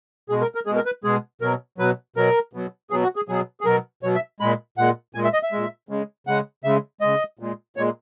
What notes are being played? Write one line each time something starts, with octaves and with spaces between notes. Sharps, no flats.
B2 G#3 G#4
A#4
A#4
B2 G#3 G#4
A#4
B4
B2 G#3 G#4
B2 F#3 A#4
B2 F#3 B4
B2 F#3 A#4
B2 F#3
B2 F#3 G#4
F#4
G#4
B2 F#3 G#4
G#4
B2 F#3 A#4
B2 F#3 C#5
E5
A#2 G#3 B5
A#2 G#3 F#5
A#2 G#3 G#5
E5
D#5
E5
A#2 G#3
C#3 G#3
C#3 G#3 F#5
C#3 G#3 E5
C#3 G#3 D#5
A#2 G#3
A#2 G#3 C#5